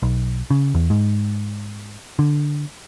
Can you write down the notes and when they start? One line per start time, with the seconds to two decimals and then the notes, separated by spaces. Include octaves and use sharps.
0.03 B1
0.50 C#3
0.74 E2
0.90 G#2
2.19 D3